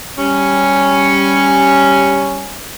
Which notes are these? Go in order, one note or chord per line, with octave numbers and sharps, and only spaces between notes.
G3 C#4